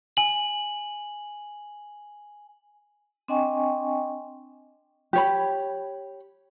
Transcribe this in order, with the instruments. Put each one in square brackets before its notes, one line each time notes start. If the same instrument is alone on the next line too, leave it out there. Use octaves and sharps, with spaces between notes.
[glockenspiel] G#5 F#7
[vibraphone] C4 D4 D#5 G5 G#5 C#6
[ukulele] G4 C#5 B5